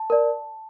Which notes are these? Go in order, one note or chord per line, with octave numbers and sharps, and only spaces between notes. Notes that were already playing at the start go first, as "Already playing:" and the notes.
Already playing: A5
A#4 D5